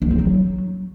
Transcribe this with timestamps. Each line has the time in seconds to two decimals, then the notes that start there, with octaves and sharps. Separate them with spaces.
0.02 D4
0.10 C4
0.19 F#3